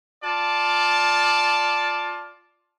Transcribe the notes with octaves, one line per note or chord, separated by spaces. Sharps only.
F4 D5 A5